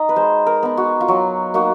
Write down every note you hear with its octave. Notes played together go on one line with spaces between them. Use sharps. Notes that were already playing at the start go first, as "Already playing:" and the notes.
Already playing: D#4 D#5
B4
G#3 C5
A#4
B3 D#4
F#4
F4
F#3 F#4
A#3 D#4 F#4